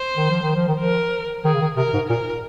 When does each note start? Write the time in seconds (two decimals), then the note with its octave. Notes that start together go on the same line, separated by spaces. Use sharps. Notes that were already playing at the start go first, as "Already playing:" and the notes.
Already playing: C5
0.17 D#3
0.30 F3
0.42 D#3
0.55 F3
0.68 D#3
0.80 F3 A#4
1.44 D#3 G#4
1.54 C#3
1.61 D#3
1.77 C3 A#4
1.93 G#2
2.09 A#2 A#4